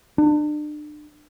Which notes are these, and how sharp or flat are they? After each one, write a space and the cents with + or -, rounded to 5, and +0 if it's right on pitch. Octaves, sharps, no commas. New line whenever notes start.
D4 +35